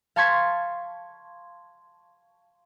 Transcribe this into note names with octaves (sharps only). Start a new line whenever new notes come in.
F5 A5 C6 C#6 G#6 B6